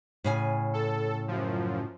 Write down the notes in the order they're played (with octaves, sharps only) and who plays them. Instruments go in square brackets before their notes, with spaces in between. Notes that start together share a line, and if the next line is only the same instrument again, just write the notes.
[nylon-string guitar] A2 C#3 G#5
[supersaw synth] A4
F#2 F3